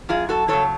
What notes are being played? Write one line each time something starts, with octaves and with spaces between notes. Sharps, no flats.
F#2 F4 G#4
F#4 A4
C#3 F#3 A4 C#5